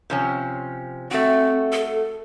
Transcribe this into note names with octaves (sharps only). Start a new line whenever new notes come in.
C3 F3 C#4
A3 C4 F#4
A4